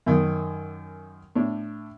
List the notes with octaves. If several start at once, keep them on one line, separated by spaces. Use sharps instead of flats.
F#2 D#3
A2 D4